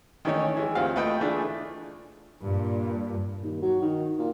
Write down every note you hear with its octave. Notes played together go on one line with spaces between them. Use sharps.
D#3 E3 A3 C#4 D#4 C#5
E3 G#3
D2 G2 C4 F4 F5
A3 F4 B4 D#5 G5
E3 A3 D4 F4 G#4
G2 A#2
D#2
F#3
D#3
A#2